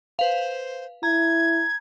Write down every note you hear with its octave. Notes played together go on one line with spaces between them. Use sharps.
B4 C5 F5
E4 A#5 G#6